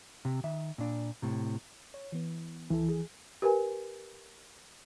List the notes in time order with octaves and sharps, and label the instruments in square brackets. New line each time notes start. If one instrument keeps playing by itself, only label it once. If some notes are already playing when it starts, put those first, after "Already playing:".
[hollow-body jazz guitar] C3
D#3 E5
A#2 D4
A2 C3
[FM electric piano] C#5
E3 B3
[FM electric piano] C#2 E4 A4 [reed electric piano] E3
[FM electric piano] G#4
[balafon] G4 A#4 B4 G#5